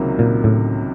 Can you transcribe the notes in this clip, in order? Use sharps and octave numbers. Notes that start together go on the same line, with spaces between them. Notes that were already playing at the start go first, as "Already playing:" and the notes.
Already playing: C#2 C3 D#3 F#3 A#3
A#2
A2